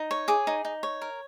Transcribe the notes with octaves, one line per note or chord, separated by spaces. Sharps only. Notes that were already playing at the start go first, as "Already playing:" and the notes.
Already playing: D#4
C#5
G#4 D6
D#4
D#4
C#5
A#4